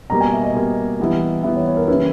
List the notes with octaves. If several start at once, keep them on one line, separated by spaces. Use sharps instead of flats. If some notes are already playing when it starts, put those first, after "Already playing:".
B2 G3 A#3 A#5
G#5
E5
D#5
B2 G3 A#3
E3 G3 B3 E4
E3 G3 B3 E4 E5
C#5
C#5
A#4
C#3 E3 G3 A#3 E4 B4